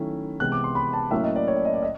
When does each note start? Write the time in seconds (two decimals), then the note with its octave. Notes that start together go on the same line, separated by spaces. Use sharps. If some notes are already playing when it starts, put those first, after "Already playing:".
Already playing: D#3 F#3 A3 C#4 E4
0.40 C3 E3 G#3 B3 F#6
0.52 D6
0.64 C6
0.75 B5
0.93 A5
1.11 A2 F#3 A#3 C#4 E4 E5
1.23 D#5
1.36 D5
1.48 C#5
1.56 D5
1.65 D#5
1.74 D5
1.83 D#5